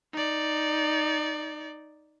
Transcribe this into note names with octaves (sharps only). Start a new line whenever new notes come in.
D#4 D5